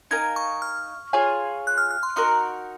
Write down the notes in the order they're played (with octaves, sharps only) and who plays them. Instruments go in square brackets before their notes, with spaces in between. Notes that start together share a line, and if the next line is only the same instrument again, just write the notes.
[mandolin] D#4 A#4 F5 G#5 [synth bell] G#6
[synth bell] C#6
F6
[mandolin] F4 G#4 C#5 G#5
[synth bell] F#6
F6
F6
C6
[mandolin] D#4 F#4 A#4 [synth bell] C6